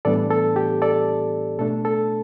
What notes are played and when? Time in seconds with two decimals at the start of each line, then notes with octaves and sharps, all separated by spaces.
0.05 A2 E3 G3 B3 D4 A4 D5
0.30 A4
0.56 G4
0.82 A4 D5
1.59 B2 A3 D4 A4
1.85 A4